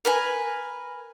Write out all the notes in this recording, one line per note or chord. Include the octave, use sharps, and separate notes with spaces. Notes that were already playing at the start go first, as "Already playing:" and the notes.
A#4 B4 G#5